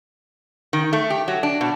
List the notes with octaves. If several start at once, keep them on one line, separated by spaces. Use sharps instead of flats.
D#3
A3
G4
F#3
D4
B2